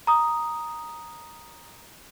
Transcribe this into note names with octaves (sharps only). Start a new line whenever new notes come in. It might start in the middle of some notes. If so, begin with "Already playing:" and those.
A#5 D#6